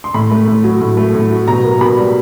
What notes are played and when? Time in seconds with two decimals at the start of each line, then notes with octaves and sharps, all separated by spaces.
0.04 C6
0.14 A2 B5
0.31 A3
0.48 A2
0.64 F#3
0.81 A2
0.97 A3
1.15 A2
1.30 F#3
1.48 B2 A#5
1.64 A#3
1.81 B2 B5
1.98 G3